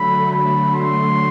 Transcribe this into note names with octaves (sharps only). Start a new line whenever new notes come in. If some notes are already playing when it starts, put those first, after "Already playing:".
Already playing: D3 F#3 A3 B5
B5
C6